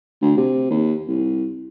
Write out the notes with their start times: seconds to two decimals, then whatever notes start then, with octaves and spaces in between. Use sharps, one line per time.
0.22 D2
0.37 C3
0.70 D#2
1.08 C2